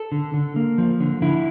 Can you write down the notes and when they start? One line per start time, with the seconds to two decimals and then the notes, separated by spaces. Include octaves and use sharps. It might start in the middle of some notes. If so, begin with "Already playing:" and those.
Already playing: A4
0.12 D3
0.34 D3
0.56 A#3
0.78 F3
1.00 D3
1.22 D3 E4